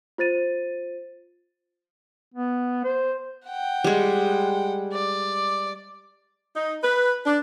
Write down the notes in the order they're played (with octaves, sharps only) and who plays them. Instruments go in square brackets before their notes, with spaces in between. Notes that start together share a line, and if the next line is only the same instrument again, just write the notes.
[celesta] F4 C5 A6 D#7
[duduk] B3
C5
[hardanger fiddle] F#5 G5
[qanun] G3 G#3
[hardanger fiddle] D5
[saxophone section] D#4
B4
D4